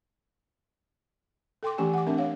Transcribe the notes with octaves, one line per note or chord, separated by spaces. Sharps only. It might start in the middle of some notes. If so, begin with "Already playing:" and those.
A4 G5 C6 D6
E3 A3 C#4 G4 G#5
F#5 D6
A3 C4 D4 A#4 E5
C#5 F5